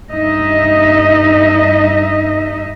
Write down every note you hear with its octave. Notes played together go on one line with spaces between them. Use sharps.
G2 D#4 D#5 E5